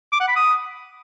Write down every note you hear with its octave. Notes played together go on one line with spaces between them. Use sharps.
D6
F#5
B5
D#6